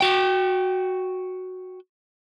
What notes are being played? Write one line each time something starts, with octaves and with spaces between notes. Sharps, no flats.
F#4 G5